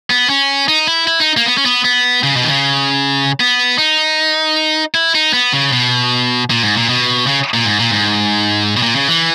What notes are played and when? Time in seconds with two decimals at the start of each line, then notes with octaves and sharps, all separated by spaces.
0.10 B3
0.30 C#4
0.68 D#4
0.87 E4
1.07 E4
1.20 D#4
1.37 A#3
1.46 B3
1.58 C#4
1.66 B3
1.85 B3
2.23 C#3
2.36 B2
2.44 D#3
2.49 C#3
3.40 B3
3.78 D#4
4.95 E4
5.15 D#4
5.33 B3
5.53 C#3
5.73 B2
6.50 A#2
6.63 G#2
6.76 A#2
6.89 B2
7.27 C#3
7.54 A#2
7.66 G#2
7.79 A#2
7.92 G#2
8.77 B2
8.82 A#2
8.96 C#3
9.08 E3